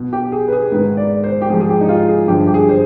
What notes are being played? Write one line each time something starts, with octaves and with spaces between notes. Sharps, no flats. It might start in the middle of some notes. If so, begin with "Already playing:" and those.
Already playing: B2
G4
G#4
B4
G#4
G#2 D#3 B4
D5
C5
G4
G#2 F3 G#4
G#4
G4
D#4
F4
G#4
G2 D3 F3 G4
G4
G#4
C5